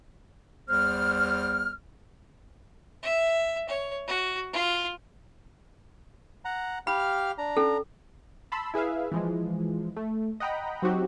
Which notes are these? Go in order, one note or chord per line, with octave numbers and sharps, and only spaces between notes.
E2 G3 C5 F6
E5
C#5
F#4
F4
F#5 A#5
G4 F5 B5 F6
D4 A#5
C#4 A4
A5 B5 C6 E6
E4 G#4 B4 E5 F5
E3 F3 G#3
A3
D#5 F#5 G5 A#5 B5
F#3 C4 D#4 F#4 G4